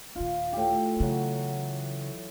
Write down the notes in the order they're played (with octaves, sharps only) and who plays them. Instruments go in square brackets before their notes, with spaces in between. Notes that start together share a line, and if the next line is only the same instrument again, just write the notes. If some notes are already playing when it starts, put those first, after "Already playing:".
[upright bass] D#1 D#3 [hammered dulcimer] F4
[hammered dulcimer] A2 G4
[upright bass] C#3 [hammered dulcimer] E3 F#3 F#4